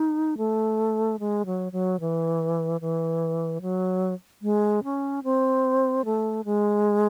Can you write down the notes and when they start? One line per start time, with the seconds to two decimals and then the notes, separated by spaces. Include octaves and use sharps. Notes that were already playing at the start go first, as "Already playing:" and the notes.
Already playing: D#4
0.38 A3
1.19 G#3
1.46 F#3
1.72 F#3
2.00 E3
2.81 E3
3.62 F#3
4.42 G#3
4.84 C#4
5.24 C4
6.05 A3
6.45 G#3